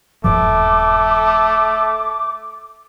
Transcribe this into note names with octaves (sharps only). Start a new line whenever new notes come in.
D#1 G2 F3 A3 D6